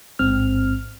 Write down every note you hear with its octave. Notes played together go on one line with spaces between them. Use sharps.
A1 G#2 C4 F6